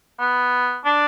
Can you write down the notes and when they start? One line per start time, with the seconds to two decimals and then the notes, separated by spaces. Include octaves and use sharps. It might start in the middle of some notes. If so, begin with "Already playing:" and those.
0.19 B3
0.85 D4